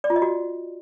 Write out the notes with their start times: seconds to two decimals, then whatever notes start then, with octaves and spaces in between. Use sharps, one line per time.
0.04 D5
0.10 F4
0.16 D#5
0.22 F#4